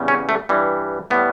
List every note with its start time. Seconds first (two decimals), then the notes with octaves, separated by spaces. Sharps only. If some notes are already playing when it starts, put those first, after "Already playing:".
Already playing: E2 C#3 G3
0.08 C#4
0.29 A3
0.49 G2 E3 G3
1.10 A2 G3 B3